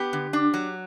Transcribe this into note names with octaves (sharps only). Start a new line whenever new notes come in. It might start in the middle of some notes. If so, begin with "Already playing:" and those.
Already playing: B3 G4
D3
D4
F#3